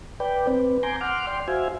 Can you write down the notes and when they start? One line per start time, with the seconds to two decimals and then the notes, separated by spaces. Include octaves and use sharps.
0.20 B4 D5 G5
0.47 C4 B4
0.83 G#5 A#5 C6 D6 G6
1.01 F#5 C6 D6 F6
1.27 D5 G5 C6
1.48 F#4 C5 E5 F5 G#5